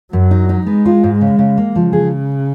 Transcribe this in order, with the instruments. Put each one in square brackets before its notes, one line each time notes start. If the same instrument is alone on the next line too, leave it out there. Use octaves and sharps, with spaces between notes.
[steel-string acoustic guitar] F#2 [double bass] F#3
[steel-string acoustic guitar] D#4
D#4
[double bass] G#3 [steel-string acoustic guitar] B3
[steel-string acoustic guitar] F4
G#2
C#3
C#3
A#3
[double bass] C#3 [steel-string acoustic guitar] F3
[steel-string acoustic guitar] G#4